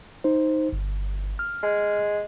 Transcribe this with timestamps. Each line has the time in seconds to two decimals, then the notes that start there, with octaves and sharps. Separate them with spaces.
0.24 D#4 C5
0.73 G1
1.39 F6
1.63 G#3